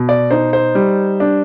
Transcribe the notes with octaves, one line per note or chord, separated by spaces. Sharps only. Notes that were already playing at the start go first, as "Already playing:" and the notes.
Already playing: B2
D5
D#4 C5
C5
G3
D4